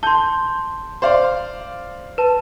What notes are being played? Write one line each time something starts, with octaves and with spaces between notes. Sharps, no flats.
A5 C6 G6
C5 D5 F5
B4 A5